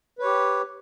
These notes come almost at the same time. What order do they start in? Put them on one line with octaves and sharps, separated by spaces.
B4 C#5 G4